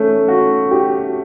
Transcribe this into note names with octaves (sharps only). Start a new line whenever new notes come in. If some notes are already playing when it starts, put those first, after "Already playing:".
Already playing: A3 C#4
F#4
G4